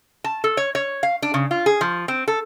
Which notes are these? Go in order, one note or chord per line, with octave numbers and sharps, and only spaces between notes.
A5
A4
C#5
C#5
F5
D4
C#3
F4
G#4
F3
C4
A4